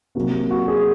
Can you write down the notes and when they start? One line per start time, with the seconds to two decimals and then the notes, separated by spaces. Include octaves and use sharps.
0.15 C3 F#3 A#3 F#4
0.50 F#4
0.68 G#4